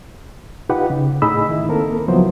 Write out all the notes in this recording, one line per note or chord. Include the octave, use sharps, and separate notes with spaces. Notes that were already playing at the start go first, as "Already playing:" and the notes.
D#4 F4 G4 B4 F#5
C#3
A2 D#4 G#4 D#5 B5 E6
D#3 E4
A#3 C4 A4 A#4
C#2 F3 F#3 B3 E4 C5